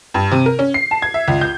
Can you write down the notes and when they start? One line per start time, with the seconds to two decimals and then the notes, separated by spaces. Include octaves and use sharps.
0.14 G2
0.32 C3
0.46 A#4
0.59 C#4
0.74 C7
0.91 A5
1.02 G#6
1.14 E5
1.28 C#2
1.41 G6